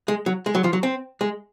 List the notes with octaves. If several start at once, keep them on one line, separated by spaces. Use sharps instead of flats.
G#3
F#3
G#3
F#3
F3
F#3
C4
G#3